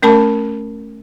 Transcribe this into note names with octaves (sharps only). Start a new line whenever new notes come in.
A3 C#4 A#4 A5 B5